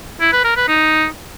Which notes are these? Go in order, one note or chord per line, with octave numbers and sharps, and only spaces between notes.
E4
B4
A#4
B4
D#4